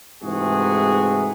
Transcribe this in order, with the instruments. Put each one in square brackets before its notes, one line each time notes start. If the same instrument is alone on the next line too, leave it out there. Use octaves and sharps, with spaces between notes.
[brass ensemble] G#2 C3 E3 A3 F#4 G#4